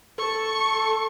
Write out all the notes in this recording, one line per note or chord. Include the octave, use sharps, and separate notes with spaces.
A4 C#6